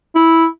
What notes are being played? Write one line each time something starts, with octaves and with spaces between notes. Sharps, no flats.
E4